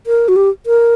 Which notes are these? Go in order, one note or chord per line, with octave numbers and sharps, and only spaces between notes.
A#4
F#4
G4
A#4